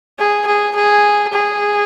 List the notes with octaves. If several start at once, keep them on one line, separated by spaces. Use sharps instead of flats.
G#4
G#4
G#4
G#4